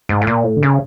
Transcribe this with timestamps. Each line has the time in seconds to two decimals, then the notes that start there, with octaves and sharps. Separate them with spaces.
0.09 G#2
0.21 A2
0.27 A#2
0.44 A2
0.56 D3
0.63 C#3